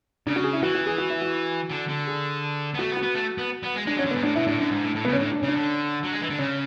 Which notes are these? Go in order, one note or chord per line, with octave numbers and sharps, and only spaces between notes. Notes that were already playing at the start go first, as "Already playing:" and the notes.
C#3 D4
F#4
G#4
E4
E3 F#4
F#4
G#4
F#4
E4
F#4
D3
D3
G#4
B3
A3 F#4
B3
F#4
B3
A3
B3
B3
G#3
G#3 D4
F#3 C#4
D3
G#2 B3
A2 D4
B2 E4
A2 D4
F#2
G#2
A2
A2
C#3 B3
C#4
A2 D4
D4
C#3 C#4
D4
D3
F#3
G#3
E3
D3
C#3 C#4